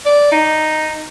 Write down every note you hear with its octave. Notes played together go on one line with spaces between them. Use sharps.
D5
D#4